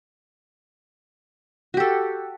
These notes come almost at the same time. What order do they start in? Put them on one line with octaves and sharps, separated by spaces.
F#4 G4 A4